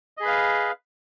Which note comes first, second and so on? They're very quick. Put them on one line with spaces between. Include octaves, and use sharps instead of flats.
D#5 G#4 B5 B4 F5